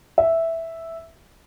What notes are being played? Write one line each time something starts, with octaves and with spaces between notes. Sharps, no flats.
E5